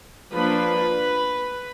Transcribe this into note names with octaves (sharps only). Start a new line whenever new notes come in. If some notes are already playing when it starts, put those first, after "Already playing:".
F3 A#3 D4 B4